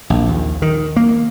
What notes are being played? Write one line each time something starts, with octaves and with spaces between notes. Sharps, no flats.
A#1
D#2
D#3
A#3